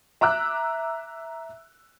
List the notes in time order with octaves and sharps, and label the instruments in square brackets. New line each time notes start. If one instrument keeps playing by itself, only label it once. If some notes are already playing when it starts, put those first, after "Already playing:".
[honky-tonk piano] E5 A#5 D6 E6 F#6